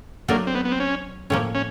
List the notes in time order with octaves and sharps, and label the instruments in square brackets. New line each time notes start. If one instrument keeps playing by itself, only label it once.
[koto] F#3 A3 D4 [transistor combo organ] A#3
[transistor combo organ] C4
B3
B3
C4
C#4
[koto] A2 F3 A#3 [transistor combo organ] C#4
[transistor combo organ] C#4